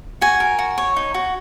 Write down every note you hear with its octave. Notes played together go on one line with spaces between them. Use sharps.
F#4 G#5
A#4
F#4
C#5
D#4
F#4